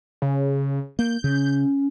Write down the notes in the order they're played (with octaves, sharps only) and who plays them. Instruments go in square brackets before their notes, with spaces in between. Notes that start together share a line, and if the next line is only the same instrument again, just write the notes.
[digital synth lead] C#3
[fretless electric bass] A#3 [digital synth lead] G6
[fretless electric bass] C#3 [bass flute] C#4